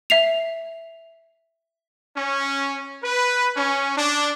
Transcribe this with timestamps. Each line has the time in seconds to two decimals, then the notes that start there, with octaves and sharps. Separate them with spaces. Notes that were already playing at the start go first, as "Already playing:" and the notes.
0.10 E5 C7 F7
2.16 C#4
3.03 B4
3.56 C#4
3.97 D4